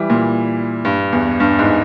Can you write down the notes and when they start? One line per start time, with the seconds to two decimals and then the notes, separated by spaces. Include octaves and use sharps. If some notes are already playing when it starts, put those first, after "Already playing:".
Already playing: E3 G3
0.10 A#2
0.85 G2
1.12 E2
1.40 G2
1.59 G#2